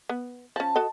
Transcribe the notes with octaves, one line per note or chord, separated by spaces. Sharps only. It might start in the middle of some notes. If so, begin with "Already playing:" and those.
B3
F3 C#4 A5
F#4 A4 D#5